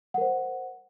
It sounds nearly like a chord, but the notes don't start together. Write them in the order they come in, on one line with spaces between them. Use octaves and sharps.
F#5 A#4 C5